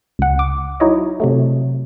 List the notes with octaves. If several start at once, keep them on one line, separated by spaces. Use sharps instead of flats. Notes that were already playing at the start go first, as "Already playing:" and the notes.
C#2 F#5
D6
F#3 D#4 E4 C#5 D#5
C3 F#3 A3